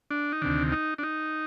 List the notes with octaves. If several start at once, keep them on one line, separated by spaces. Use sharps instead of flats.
D4
D#4
D2 C3 D#3 D4
D#4
D4
D#4